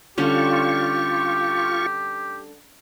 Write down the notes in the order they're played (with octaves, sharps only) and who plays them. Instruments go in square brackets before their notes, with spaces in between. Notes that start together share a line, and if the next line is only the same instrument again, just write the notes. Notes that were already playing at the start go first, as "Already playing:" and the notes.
[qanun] D3 G3 C#4 [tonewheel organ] F4 C#6 [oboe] G4